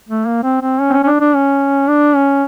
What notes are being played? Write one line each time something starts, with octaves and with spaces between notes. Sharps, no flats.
A3
A#3
C4
C4
C#4
C4
C#4
C#4
D4
D4
C#4
D4
C#4